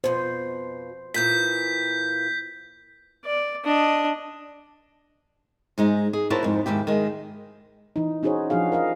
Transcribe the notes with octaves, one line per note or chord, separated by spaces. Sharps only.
F2 B2 C5
A#2 E3 G6 B6
D5
D4 D#5
G#2 G#3 D#4
G#4
E4 F#4 A#4 C5 C#5 A5
F2 G#2
D#2 G#2 E4 G4
D#3 G#3
E3 D#4
C#4 D#4 F#4 G#4 C5 C#5
F3 D4 F#4 G#4 F5
A#4 D#5 F5